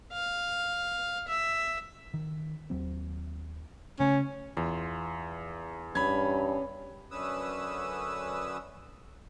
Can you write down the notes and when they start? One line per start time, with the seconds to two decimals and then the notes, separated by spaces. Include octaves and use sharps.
0.13 F5
1.28 E5
2.14 D#3
2.70 D#2 F#3 C4
4.00 C#3 A3 C#4
4.57 E2 F4
5.95 G2 C#4 B5 G#6
7.11 F#2 D3 C#4 B4 D#6 E6